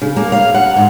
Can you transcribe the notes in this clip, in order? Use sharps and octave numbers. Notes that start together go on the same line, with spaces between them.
C#3
A#3
F5
F#5
G#2